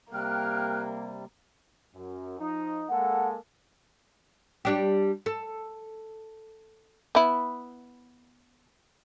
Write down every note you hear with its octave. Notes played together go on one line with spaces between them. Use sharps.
C3 G3 A#3 G5 F6 F#6
F#2
F3 D#4
G#3 A#3 A4 F#5
G3 D4 G4
A4
B3 E4